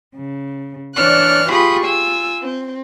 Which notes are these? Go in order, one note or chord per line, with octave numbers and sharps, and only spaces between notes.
C#3
E3 D4 C#5 D5 F6 F#6
F4 G4 G#4 B5 C#6 D#6
F4 G#5 E6
C4